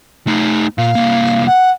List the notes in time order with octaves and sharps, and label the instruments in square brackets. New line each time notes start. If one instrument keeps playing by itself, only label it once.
[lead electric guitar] A3 D#4
[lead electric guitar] A#2 [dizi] F5
[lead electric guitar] C2 A#3
[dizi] F#5